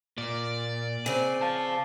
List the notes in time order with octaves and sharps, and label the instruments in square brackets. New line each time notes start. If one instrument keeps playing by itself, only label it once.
[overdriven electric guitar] A#2 [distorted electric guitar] D5
[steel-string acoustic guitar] C#3 C4 [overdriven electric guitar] G#5
[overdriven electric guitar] C5 F5 [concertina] A5